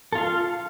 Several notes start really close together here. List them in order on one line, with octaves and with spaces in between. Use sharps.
A4 F4 F5